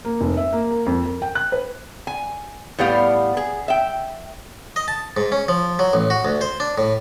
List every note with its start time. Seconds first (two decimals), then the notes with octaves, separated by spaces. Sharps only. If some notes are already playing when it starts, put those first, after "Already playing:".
0.05 A#3
0.21 F1
0.37 E5
0.53 A#3
0.71 A#3
0.87 F2
1.06 A#4
1.22 G5
1.35 F#6
1.52 B4
2.07 G#5
2.79 A2 G3 B3 G4 F5
3.37 G#4
3.68 E5 G5
4.76 D#5
4.88 A5
5.17 G#2
5.32 C#4
5.48 F3
5.79 F#3
5.93 A1
6.10 F#4
6.25 D2
6.41 C5
6.60 D4
6.78 A2